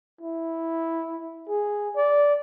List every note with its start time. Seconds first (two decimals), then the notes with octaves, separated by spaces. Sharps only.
0.21 E4
1.48 G#4
1.96 D5